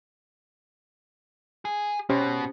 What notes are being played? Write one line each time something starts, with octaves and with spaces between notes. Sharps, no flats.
G#4
B2 C#4 G4 C5